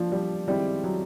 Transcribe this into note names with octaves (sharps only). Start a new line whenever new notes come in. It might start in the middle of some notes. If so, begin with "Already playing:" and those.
Already playing: F3 A#3 D4 F4
G3
D#3 G3 G#3 C4 E4
F#3